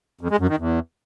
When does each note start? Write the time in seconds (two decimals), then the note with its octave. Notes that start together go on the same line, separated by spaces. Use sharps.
0.21 F2
0.30 G#3
0.40 F#2
0.49 D#3
0.58 E2